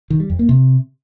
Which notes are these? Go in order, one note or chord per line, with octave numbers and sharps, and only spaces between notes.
D#3
G3
F2
A#3
C3